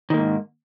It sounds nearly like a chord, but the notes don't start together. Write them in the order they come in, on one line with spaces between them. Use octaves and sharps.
D#3 A#3 G#2